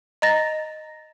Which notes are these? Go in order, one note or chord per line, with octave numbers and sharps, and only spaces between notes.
D#5 A#5 A6 A#6